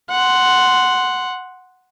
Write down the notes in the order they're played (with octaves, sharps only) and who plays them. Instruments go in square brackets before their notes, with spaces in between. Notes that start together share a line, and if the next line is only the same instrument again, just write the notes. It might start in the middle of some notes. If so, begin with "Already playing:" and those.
[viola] F#5 C6